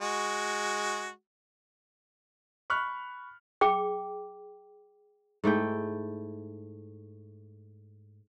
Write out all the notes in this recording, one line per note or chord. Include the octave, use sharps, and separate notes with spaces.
G#3 F#4
B5 C#6 F6 F#6
G#4 G5 D6
G#2 A3 E4 G5